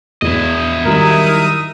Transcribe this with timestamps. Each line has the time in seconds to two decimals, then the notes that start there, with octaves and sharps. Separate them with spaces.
0.22 E2 E4 D#5
0.85 D#3 F#3 G3 D#4 A#4 E5 D#6